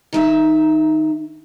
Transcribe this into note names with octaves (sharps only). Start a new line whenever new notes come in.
D#3 D#4 E5